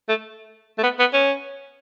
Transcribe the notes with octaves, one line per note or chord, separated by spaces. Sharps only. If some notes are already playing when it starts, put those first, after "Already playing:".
A3
A3
B3
B3
C#4